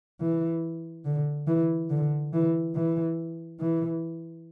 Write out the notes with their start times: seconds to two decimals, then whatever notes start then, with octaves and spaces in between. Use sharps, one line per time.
0.21 E3
1.05 D3
1.47 E3
1.90 D3
2.33 E3
2.75 E3
3.60 E3